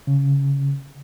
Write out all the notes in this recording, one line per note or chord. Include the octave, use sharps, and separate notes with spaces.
C#3